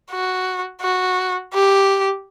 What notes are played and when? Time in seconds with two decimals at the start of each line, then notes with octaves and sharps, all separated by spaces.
0.11 F#4
0.82 F#4
1.54 G4